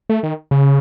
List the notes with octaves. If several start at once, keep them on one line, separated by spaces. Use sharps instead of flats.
A3
D#3
C#3